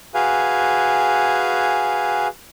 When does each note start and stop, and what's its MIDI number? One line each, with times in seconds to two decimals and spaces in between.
0.14 2.28 66
0.14 2.28 68
0.14 2.28 71
0.14 2.28 77
0.14 2.28 80